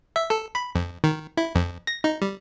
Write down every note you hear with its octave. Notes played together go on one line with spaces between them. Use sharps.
E5
A4
B5
F2
D#3
E4
F2
A#6
D#4
G3